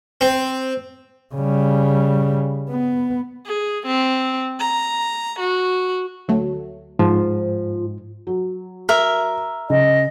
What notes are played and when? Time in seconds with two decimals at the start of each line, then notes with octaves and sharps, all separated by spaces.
0.21 C4
1.34 C#3 G3
2.70 B3
3.45 G#4
3.86 C4
4.59 A#5
5.39 F#4
6.28 D2 F#3 A3
6.99 G#2 F3
8.27 F#3
8.89 A#4 E5
9.70 C#3 D#5